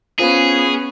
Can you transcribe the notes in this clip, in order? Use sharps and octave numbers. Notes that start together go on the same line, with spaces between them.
B3 C#4 F4 G#4 C5 F5